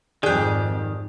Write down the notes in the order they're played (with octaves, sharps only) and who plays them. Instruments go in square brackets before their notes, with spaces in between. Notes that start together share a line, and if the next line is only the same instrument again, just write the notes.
[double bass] F2 G#2 [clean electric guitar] D#3 [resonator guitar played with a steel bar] G4 G#4 [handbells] D5 F#6